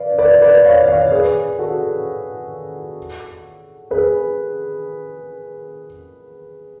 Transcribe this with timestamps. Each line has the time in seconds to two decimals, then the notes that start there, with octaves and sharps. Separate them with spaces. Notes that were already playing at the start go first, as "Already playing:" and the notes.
Already playing: B4 D5 F5
0.18 B4 D5
0.42 B4 D5
0.65 C#5 F5
0.88 C#5 F5
1.11 G#4 B4
1.59 F#4 A4
3.91 G#4 B4